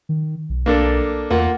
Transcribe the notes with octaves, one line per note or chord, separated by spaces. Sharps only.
D#3
B1
A#3 D4 A4
E2 A#3 F4 F#5